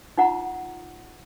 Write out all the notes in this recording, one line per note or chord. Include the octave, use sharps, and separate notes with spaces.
D#4 F4 F#5 A#5